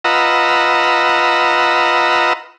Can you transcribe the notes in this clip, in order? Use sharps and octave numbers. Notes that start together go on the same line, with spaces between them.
F4 B4 D#5 F#5 A#5 E6